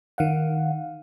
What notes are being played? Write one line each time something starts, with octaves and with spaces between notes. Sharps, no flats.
D#3 F5 F#5